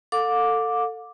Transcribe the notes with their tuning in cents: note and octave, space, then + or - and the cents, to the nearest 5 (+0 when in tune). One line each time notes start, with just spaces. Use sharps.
A4 +15 F5 +45 D6 +0